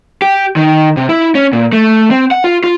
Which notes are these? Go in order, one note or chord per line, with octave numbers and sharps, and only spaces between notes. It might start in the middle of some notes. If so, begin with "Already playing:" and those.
G4
D#3
C3
E4
C#4
A#2
A3
C4
F#5
F4
F4